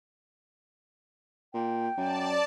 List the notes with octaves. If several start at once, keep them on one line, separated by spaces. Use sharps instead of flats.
A#2 G5
F#2 D5 A5